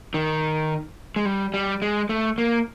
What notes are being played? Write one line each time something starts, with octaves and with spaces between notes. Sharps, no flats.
D#3
G#3
G3
G3
G#3
A3
A#3